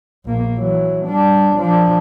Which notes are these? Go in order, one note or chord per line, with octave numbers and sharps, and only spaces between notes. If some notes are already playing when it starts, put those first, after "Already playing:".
A#1 A#3
E3 F#3
G3 D4
F3 D4